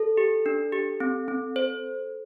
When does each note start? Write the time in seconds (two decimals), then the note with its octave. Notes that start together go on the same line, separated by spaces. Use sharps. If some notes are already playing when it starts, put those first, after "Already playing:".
Already playing: A4
0.17 G4
0.46 D4
0.73 G4
1.00 C4
1.28 C4
1.56 C5